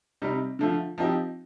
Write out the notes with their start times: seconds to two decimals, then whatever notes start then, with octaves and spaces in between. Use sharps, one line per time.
0.22 C3 G3 C4 D#4
0.59 D3 F3 A3
0.98 F3 C4 D#4 G4